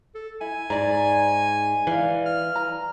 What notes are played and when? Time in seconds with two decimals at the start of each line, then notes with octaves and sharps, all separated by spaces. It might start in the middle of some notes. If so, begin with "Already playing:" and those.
0.15 A4
0.41 E4 G#5
0.70 G#2 D5 A#5
1.87 E3 D5 F5
2.26 F6
2.56 A#5